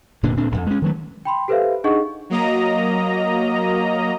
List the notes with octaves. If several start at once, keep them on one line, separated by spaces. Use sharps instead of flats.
F1 A#2 D3 D4
D2 A#2 C4 D4
D1 F2
G#3 C#4
D#3 F#3 A3
G5 B5 C6
G4 A4 B4 C5 E5 F5
D4 D#4 G#4 D#5 F#5 C#6
F#3 A#3 D#5 A#5